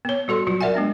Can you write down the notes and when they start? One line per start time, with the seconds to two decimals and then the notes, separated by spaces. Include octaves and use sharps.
0.05 B3 C#5
0.28 G3 F#4 A4 C6
0.47 F#3 F4 F#4
0.61 A#4 D5 E5 F#5 G#5
0.75 G#3 B3 D4